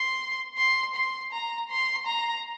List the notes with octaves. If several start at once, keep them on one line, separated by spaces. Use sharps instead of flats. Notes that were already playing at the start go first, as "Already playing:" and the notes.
Already playing: C6
C6
C6
A#5
C6
A#5